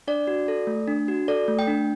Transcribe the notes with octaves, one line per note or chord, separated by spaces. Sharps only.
D4 D5
F#4
A4
A3
D4
F#4
A4 D5
A3
G5
D4